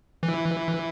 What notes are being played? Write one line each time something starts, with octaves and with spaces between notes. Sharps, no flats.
E3